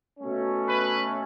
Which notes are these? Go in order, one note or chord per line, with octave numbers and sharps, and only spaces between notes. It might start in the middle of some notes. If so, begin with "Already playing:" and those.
B2 A3 C#4
B4